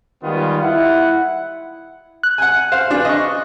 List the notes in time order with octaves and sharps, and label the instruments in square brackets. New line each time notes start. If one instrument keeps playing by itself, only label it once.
[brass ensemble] D#3 G3 G#3 B3 F4
E4 F#5
[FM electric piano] F#6
[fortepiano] F#5 G#5
C5 F5
D4 G#4 B4
D#5 C#6